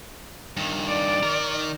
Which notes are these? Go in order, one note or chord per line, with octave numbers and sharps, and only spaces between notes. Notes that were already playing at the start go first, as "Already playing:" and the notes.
G2 D#3
D5
D#3 A#4